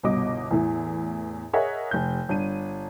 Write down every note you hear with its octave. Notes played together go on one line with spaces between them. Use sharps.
G1 C2 B2 D#5 D6
E2 A2 E3
G#4 A#4 C#5 D#5 E5 F#5
F1 G6
G1 D4 D#7